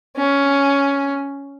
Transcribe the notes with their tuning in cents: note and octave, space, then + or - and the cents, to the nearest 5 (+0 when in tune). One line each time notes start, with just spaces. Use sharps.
C#4 +10